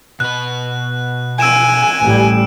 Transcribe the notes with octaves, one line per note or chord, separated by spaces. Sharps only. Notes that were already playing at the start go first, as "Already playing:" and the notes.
B2 B4 F#6
G#5 E6 D7 E7
A1 G3